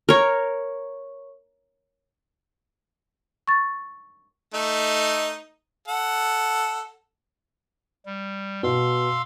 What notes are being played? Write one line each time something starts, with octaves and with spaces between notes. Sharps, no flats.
A#4 C#5
C#6 A6
A3 D#4
A4 F#5
G3
B2 F5 C6 E6